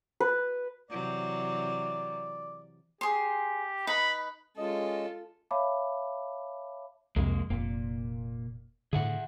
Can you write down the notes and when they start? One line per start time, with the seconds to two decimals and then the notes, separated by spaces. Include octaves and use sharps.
0.20 B4
0.91 C3 E3 F#3 D5
3.01 G4 G#4 C6
3.87 D#4 B4 B5
4.57 G#3 C#4 F4 A4 D#5
5.51 C#5 E5 F5 A5 B5 D6
7.16 C2 F2 C3 G#3 A#3
7.50 F1 A#2 A#3
8.93 A2 D3 G#4 E5 F#5